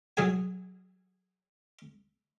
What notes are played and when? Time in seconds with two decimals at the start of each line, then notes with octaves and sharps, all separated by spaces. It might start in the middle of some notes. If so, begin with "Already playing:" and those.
0.17 F#3 G#4 G#5